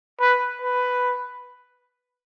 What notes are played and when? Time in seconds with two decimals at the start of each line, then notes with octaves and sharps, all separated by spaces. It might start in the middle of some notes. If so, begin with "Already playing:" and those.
0.21 B4
0.62 B4